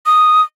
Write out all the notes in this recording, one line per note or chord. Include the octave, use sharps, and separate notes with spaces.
D#6